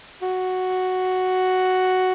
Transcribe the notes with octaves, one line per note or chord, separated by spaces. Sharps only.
F#4